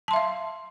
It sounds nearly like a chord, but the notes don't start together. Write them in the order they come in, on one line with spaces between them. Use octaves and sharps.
A5 C6 E5 F5